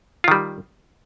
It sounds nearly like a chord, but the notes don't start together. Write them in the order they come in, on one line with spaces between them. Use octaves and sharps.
F4 D#3 G3